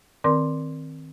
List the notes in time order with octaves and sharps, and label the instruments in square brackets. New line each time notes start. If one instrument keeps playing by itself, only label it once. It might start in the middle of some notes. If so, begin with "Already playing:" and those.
[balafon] D#3 C4 A#4 D5 C6 D6